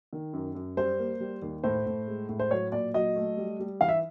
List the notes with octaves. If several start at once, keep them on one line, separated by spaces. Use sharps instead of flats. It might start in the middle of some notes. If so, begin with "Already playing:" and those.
D#3
F#2
F#2
G3 C5
A#3
G3
D#2
A2 C5
A2
G#3
A2
C5
F#3 C#5
A#2 D5
F#3 D#5
A3
G3
G3
E3 F5
E5